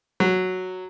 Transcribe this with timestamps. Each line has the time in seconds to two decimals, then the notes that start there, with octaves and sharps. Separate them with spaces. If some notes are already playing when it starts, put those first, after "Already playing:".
0.20 F#3